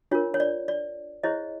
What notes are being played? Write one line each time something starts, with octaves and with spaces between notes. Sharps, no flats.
D4 F4 A#4 C#5
C#5
D5
D5
E4 G#4 C5 C#5 D#5